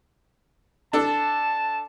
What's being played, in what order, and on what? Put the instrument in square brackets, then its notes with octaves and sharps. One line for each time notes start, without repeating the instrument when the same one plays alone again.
[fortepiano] D4 A4 [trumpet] A5